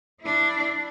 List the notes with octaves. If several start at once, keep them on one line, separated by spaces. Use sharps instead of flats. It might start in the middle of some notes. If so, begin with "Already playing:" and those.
D4 E4